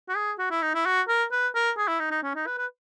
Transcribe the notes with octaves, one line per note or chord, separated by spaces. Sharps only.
F#4
G#4
F#4
E4
D#4
E4
F#4
A#4
B4
A#4
G#4
E4
D#4
D#4
C#4
D#4
B4
B4